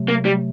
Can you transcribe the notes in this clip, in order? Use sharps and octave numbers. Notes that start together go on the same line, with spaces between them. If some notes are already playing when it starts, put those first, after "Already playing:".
Already playing: C3 F#3 A3
A#3
G3